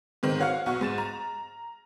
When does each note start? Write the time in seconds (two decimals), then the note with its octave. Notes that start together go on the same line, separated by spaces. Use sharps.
0.23 G#2 D#3 C4
0.40 F#4 C#5 F5 F#5 F6
0.66 B1 F#4 C#6
0.81 G#2 A6 E7
0.98 A#5